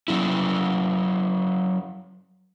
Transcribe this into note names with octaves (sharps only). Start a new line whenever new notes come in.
F#3 C#4 E4